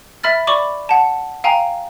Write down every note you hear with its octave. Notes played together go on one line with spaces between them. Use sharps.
E5 B5 F6 A6
D5 B5 C#6 D6
F#5 A5
F5 G5 G#5 A#5